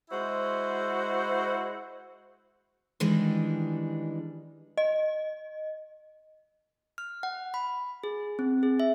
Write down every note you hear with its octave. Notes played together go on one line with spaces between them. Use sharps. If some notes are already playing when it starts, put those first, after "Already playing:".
G#3 E4 F#4 C5
D#3 E3 G3 G#3 D4
D#5
F6
F#5
B5
G#4
C4
G#4
E5